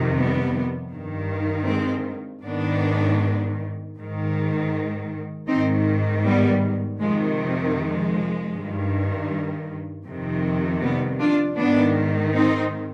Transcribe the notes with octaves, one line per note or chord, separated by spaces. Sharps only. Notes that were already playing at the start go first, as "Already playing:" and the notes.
Already playing: F2 C3 D#3
G3 B3
G2 D#3
G#3 C4
G#2 D#3 B3 D4
G#2 D#3
G#2 D#3 C4 D#4
G3 B3
F2 C3 D#3 F3 G#3
F3 G#3
G2 D#3
F2 C3 D#3
G3 B3
D4 F4
G#2 D#3 B3 D4
C4 D#4